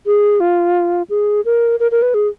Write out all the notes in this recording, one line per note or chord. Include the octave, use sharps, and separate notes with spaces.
G#4
F4
G#4
A#4
A#4
A#4
B4
G#4